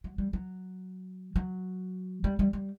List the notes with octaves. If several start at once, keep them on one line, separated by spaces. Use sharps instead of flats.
F#3
G3
F#3
F#3
G3
G3
G3